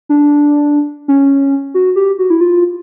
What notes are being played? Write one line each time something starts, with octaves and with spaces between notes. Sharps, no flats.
D4
C#4
F#4
G4
F#4
E4
F4